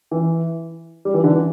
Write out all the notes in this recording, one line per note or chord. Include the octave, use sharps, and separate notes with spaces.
E3
G3
E3
D3
E3